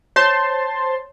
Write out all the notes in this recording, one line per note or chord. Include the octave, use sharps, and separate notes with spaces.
C5 C#5 A5 C6